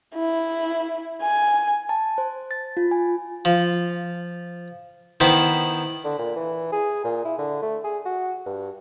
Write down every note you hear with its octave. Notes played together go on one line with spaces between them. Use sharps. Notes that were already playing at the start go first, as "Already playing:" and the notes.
E4
G#5
A5
C5
A6
F4
G#5
F3
D#3 B3 E4 C5
D3
A#2
E3
G#4
A#2
E4
D3
A3
G#4
F#4
G2